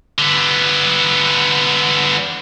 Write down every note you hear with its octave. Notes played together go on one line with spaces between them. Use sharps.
D3 B3